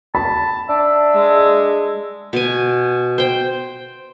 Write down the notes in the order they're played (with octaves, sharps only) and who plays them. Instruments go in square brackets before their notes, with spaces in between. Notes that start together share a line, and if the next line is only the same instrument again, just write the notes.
[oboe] A5 [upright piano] B5
[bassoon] D4 [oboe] E5
[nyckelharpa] G#3
[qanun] B2 G#5
C5 G5